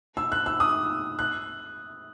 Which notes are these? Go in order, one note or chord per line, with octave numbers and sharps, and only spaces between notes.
E6
F#6
E6
D#6
F#6